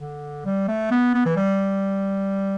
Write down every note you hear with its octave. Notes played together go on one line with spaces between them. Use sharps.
D3
G3
A3
B3
B3
E3
G3